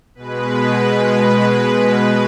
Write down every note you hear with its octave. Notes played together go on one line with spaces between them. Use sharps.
B2 G#3 B4